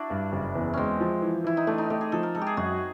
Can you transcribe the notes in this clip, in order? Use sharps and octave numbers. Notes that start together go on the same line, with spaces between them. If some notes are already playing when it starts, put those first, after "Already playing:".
Already playing: D4 E4 F#4
G2
F#1
E2
G#3 C4 C#4
F3
E3
E3 E4
D#4
A3 D4
D#4
A3 G4
G#4
F3 A4
A#4
G#3 A4
G4
G#4
F#2 F#4